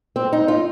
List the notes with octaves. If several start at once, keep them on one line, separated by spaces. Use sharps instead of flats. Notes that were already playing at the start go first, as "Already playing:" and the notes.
C4
D#4
F4